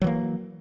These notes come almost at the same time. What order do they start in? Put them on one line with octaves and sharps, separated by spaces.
F#3 E3 A#3